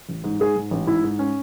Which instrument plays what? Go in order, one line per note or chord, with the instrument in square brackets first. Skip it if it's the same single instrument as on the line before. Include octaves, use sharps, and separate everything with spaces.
[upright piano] A1
G#2
[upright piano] G#2 [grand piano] G#4
[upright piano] G#2
A1
[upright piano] G#2 [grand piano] E4
[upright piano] G#2
C#4